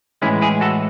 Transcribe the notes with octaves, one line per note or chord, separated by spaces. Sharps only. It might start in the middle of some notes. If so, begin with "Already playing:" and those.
A2 E3 G#3 C#4 E4
E4 G#4
F#4 A4